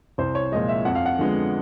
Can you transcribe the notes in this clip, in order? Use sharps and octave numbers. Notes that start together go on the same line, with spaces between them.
C2 C5
C#5
A#2 F3 G#3 D#5
E5
F2 F#5
F5
F#5
D3 F3 G#3 B3